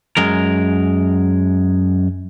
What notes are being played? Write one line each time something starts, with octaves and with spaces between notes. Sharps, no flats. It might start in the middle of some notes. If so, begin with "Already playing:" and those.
F#2 G#3 A#4